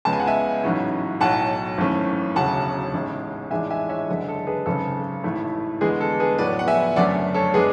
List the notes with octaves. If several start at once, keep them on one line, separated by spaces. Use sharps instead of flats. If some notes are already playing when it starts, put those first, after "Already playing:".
C#2 C#3 G#3 B3 A5
G#5
F#5
E5 G#5
A1 G#2 F#3 C#4 E4
B1 A2 F#3 F#5 A5
G#1 F#2 E3 A3 C#4
E1 D2 C#3 F#3 F#5 A5
A1 G#2 G#3 C#4
A1 G#2 E3 G#3 D4 E5 G#5
E5 G#5
C#5 E5
F#1 F#2 D3 G#3 A4
A4
G#4 B4
G#1 F#2 C#3 A4
A1 G#2 E3 A3 E4
E2 D3 G#3 B3 G#4
A4
G#4 B4
A2 F#3 B3 B4 D5
F#5
E5 G#5
F#1 F#2 D3 A3 D5 F#5
A4 C#5
G#3 B3 D4 G#4 B4